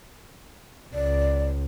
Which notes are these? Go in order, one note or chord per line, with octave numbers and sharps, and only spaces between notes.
C#2 D5